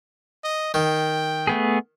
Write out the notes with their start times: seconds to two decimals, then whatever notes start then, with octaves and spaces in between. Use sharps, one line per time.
0.44 D#5
0.74 D#3 G5
1.47 A3 B3 G#4